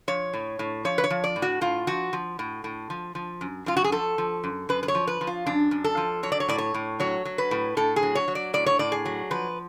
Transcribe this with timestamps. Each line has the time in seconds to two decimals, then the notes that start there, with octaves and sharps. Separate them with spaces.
0.08 F3 C#5
0.33 A2
0.59 A2
0.85 F3 C#5
0.98 B4
1.04 C#5
1.10 F3
1.24 D5
1.36 A2
1.42 F#4
1.61 A2 F4
1.87 F3 F#4
2.13 F3
2.39 A2
2.64 A2
2.90 F3
3.15 F3
3.41 F#2
3.66 F#2 F4
3.77 F#4
3.84 G#4
3.92 F3 A4
4.18 F3
4.44 F#2
4.69 F#2 B4
4.83 B4
4.88 C#5
4.95 F3
5.07 B4
5.21 F3
5.27 F4
5.46 F#2 D4
5.71 F#2
5.84 A4
5.97 F3
6.23 F#3 C#5
6.32 D5
6.40 C#5
6.49 A2 D5
6.58 C#5
6.74 A2
7.00 F#3 C#5
7.25 F#3
7.38 B4
7.51 A2
7.77 A2 A4
7.96 G#4
8.03 F#3
8.15 C#5
8.28 F#3
8.35 D5
8.54 A2 D5
8.66 C#5
8.79 A2 D5
8.92 G#4
9.05 F#3
9.31 F3 B4